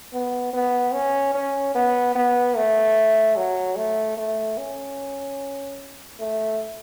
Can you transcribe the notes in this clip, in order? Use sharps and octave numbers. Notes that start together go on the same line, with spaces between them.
B3
B3
C#4
C#4
B3
B3
A3
F#3
A3
A3
C#4
A3